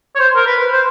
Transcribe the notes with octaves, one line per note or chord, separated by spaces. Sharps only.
C#5
C5
A#4
B4
C5